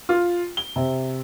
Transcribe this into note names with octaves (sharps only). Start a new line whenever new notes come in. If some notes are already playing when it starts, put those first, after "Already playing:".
F4
G7
C3